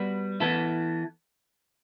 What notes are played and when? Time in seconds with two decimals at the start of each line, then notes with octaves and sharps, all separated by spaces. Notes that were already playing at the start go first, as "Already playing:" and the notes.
Already playing: G3 B3 F#4 B4
0.40 E3 B3 E4 A4